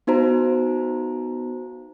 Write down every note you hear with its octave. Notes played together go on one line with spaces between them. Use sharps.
B3 D#4 F#4 C5 A#5